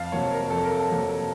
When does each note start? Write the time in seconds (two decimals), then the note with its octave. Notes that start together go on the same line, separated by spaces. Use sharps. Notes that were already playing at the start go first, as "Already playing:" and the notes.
Already playing: F2 F5 A5
0.12 C3 F#3 A#3 C#5
0.32 A#4
0.50 F2 A4
0.65 A#4
0.79 A4
0.89 C3 F#3 A#3